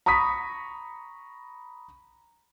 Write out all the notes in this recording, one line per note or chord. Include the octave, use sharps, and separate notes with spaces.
A#5 B5 C#6 D#6 B6